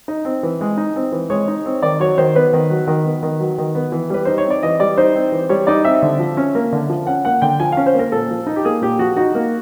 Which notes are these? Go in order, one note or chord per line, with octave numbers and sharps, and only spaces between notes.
D#4
C4
E3
G#3
D#4
C4
E3
G#3 C#5
D#4
C4
D#3 D5
F#3 C#5
D#3 C5
B3 B4
D#3
F#3
D#3
B3
D#3
F#3
D#3
B3
E3
G3 B4
D#4 C5
C#5
C4
D5
E3 D#5
G3 D5
D#4 C5
C4
E3
G3 C#5
D#4 D5
C4 E5
D3
F3
C#4
A#3
D3
F3
C#4 F#5
A#3 F#5
D3 G5
F3 G#5
C#4 F5
C5
A#3 A#4
A#2 A4
F3
D#4
G4
A#3 G#4
A#2 G4
F3 F#4
D#4 F#4
A#3